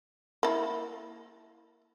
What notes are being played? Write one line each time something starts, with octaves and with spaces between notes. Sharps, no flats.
A#3 E4